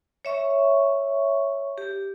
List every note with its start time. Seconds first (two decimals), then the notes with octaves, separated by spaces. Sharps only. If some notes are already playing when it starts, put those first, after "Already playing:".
0.25 C#5 E5 C#6
1.78 G4